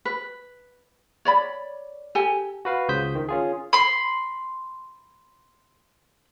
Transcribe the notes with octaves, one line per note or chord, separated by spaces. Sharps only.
B4
C#5 D5 B5
G4 A4 G#5
F#4 B4 F5
C#2 C#3 C5 D#6 G6 B6
D#3
C#4 F4 G#4
B5 C6